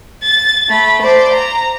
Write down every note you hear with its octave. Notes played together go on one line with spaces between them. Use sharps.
A6
A3 B5
C5 D5
A#5